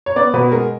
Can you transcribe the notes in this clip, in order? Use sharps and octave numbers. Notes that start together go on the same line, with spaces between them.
C#5
B3 D5
B2 B4
G#3 A#4